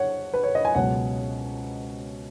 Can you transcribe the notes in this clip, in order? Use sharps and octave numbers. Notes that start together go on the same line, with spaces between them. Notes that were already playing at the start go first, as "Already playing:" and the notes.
Already playing: C#5 F#5
B4
C#5
D#5
G#5
C#2 B2 F#3 C#4 F#5